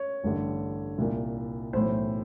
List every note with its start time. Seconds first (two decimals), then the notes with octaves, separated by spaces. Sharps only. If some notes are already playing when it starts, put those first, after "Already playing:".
Already playing: C#5
0.23 A1 G2 D3
0.98 C2 A#2
1.73 B1 A2 E3 C5